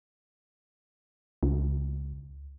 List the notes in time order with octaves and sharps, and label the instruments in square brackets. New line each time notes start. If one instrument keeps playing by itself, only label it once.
[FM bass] C#2